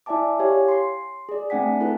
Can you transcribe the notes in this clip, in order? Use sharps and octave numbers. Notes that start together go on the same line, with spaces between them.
E4 D5 E5 G#5 A5 D6
G4 C#5 F5 G#5
C6 C7
G#4 D5
A3 C4 D4 F#5 G#5 B6
E4 A4 B4